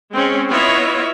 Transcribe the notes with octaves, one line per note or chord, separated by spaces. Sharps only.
G#3 C4 C#4
B3 E4 F4 C#5 D#5 E5